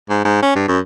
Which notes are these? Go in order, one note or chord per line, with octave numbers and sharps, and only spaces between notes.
G#2
G#2
C#4
G2
F#2